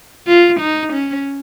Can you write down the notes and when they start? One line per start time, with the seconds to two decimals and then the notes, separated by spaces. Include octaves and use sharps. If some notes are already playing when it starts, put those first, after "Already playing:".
0.27 F4
0.60 D#4
0.93 C#4